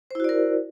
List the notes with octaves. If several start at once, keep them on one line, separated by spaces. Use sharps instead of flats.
E4 F#4 A#4 C5 D5